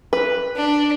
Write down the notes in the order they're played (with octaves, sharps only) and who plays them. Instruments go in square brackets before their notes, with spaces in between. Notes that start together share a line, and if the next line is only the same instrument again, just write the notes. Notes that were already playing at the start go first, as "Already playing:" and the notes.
[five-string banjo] B4
[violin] D4